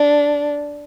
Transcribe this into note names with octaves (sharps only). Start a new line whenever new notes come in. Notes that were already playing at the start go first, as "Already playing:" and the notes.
Already playing: D4